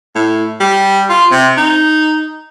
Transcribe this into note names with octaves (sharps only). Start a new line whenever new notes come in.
A2
G3
F4
C3
D#4